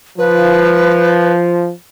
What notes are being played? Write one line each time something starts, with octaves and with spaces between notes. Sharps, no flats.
F3 B4